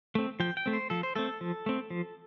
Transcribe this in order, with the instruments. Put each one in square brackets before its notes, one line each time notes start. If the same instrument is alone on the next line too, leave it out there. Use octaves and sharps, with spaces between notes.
[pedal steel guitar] A3 C4
F3 G5
G5
A3 C4
C5
F3 A4
C5
A3 C4 A4
F3
A3 C4
F3